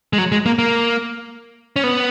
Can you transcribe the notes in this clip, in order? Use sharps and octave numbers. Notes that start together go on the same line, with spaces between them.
G#3
F#3
G#3
A#3
A#3
C#4
B3